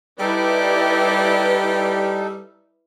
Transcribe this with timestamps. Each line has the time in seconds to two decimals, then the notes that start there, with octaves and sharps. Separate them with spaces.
0.20 G3 D#4 E4 G4 A4 B4 D5